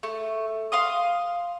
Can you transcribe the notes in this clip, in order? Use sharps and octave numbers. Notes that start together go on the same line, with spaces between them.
A3
F5 C6 D#6